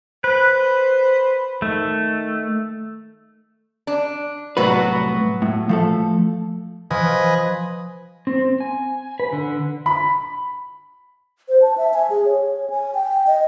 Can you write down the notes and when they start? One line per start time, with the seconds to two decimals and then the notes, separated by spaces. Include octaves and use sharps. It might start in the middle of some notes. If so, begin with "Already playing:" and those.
0.24 B4 C5
1.62 D#3 A3
3.87 D4
4.57 C2 A2 F#3 B3 F#4 B4
5.42 A2
5.69 F3 A3 A4
6.91 F3 B4 D#5 G#5
8.27 C4
8.60 G#5
9.20 B4
9.33 D3
9.86 B5
11.49 C5
11.62 A5
11.78 E5
11.94 G#5
12.10 G#4
12.25 C#5
12.70 G#5
12.94 G5
13.27 D#5